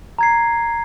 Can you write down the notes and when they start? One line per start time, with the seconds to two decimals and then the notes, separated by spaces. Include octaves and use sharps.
0.19 A#5 G#6 C7